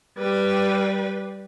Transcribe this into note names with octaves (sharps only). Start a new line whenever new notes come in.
G3 B4